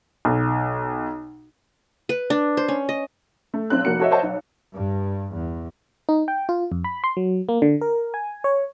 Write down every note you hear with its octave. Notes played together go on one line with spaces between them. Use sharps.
B1
B4
D4
C5
C#4
D#5
A3
B1 C4 F#6
F1 A#3 F#4 C#7
F#4 A4 C#5 D#5 E5
C5 C#5 D#5 E5 F#5 A5
B1
G2
E2
D#4
G5
F4
F2
B5
C6
F#3
A#3
D3
A#4
G#5
C#5